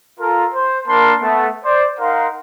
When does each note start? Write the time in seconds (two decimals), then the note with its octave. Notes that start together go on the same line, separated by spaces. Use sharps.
0.19 F4 A4 A#4
0.54 C5
0.87 A#3 D4 A#4 A5 B5 C6
1.21 A3 B3
1.64 C5 D5
1.99 D#4 A#4 F5 F#5 C6